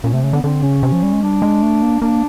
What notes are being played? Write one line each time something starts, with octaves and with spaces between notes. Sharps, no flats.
A#2 C#4
C3 A3
C#3 A3
D3 B3
D3 C4
C#3 C#4
C3
F3
G3
G#3
G3 D4
G#3
A3
A#3
A#3 D4